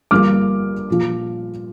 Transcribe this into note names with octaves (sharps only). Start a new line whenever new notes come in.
G1 G2 F3 A#3 D6 F6
A#2 F3